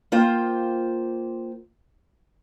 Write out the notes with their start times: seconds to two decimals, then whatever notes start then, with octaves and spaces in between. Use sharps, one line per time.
0.12 A#3 F4 C5 G5